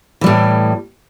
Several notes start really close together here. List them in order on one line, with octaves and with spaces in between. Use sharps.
E3 G3 A2